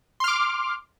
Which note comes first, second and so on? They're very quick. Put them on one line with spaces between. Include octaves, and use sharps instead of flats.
C6 F6 D6